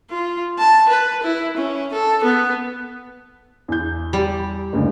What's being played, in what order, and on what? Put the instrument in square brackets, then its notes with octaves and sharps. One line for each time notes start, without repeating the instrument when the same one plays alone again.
[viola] F4
A5
B4
E4
C#4
A4
B3
[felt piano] E2 G6
[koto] G3
[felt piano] F#1 D2 G2